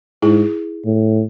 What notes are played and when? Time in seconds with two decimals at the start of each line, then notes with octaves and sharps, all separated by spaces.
0.22 G#2 E4 G#4
0.85 A2